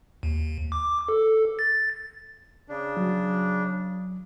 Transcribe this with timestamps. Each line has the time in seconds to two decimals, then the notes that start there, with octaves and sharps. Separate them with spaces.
0.23 D#2
0.72 D6
1.08 A4
1.59 A6
2.68 C#3 D4
2.97 F#3